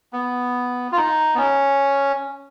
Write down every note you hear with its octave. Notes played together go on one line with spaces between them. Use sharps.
B3
F4
D#4
B3
C#4